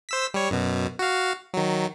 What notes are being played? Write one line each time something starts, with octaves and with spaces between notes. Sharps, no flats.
C5 E6 B6
G3 C#5
F#2 B2
F#4 F5
D#3 F#3